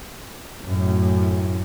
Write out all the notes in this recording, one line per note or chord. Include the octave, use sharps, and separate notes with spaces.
F#2 A2